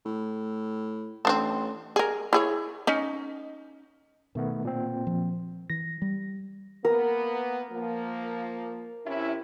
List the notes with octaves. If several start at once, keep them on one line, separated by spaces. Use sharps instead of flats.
A2
A1 C4 D4 A4
G#4 A#4
E4 G#4 C#5
C#4 D#4
B2 D#3 A3 B3
A#2 C4
F3
E3 A#6
G3
A#3 B3 A#4
F3 A#3
C3 C#4 E4